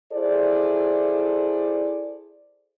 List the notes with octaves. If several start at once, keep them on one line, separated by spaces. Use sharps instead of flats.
E4 G#4 A4 C5 D5